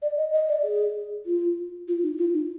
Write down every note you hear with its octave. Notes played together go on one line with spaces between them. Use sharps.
D5
D#5
D#5
D5
G#4
F4
F4
D#4
F4
D#4